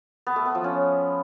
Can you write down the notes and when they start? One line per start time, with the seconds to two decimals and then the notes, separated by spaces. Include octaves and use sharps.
0.27 B3
0.36 A3
0.45 B3
0.55 F3
0.64 C#4